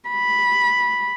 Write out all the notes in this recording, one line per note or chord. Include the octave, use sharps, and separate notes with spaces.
B5